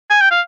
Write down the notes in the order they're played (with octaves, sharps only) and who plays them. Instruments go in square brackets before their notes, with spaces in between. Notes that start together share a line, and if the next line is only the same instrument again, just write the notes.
[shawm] G#5
G5
F5